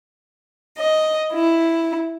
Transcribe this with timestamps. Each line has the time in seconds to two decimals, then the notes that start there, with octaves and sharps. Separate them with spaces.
0.78 D#5
1.33 E4